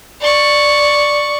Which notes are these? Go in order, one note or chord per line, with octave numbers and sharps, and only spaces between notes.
D5 C#6